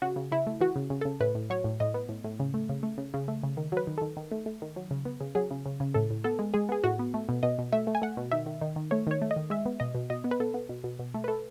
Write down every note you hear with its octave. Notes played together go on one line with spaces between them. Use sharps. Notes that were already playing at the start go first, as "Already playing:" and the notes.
C#3 F#4
C#3
C#3 E4
A3
E3 F#4
C#3
C#3
C#3 A4
A2 B4
A2
F#3 C#5
A2
A2 D#5
B3
A2
A2
C#3
A3
C#3
A3
C#3
C#3
A3
C#3
D#3
F#3 B4
D#3
D#3 A4
D#3
A3
A3
D#3
F#3
C#3
B3
C#3
F#3 G#4
C#3
C#3
C#3
A2 A4
A2
B3 A4
G#3
G#3 G#4
B3 G#4
A2 F#4
B3
A3
B2
B2 D#5
B2
A3 E5
A3
G#5
A3 F#5
B2
D#3 E5
D#3
D#3
D#3
A3 C#5
D#3 C#5
A3
D#5
D#3
G#3 E5
B3
B2 D#5
B2
B2 D#5
B3
B4
B2 A4
B3
B2
B2
B2
A3
B4
A3 A4